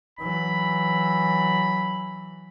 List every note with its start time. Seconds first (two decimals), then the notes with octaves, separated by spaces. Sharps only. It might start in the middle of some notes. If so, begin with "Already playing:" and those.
0.19 E3 F#3 B5